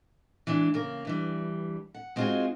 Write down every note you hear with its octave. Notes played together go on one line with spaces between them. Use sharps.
E3 G#3 D4
C#3 A#3 A#4
G2 E3 G3
F#5
G#3 C4 D#4 F4 F#4 G#4